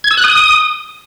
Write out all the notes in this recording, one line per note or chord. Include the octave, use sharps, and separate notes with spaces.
G#6
E6
F#6
D#6